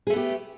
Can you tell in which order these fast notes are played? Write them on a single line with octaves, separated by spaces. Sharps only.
G#4 A3 B3 G4